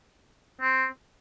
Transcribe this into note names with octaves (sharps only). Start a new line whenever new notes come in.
C4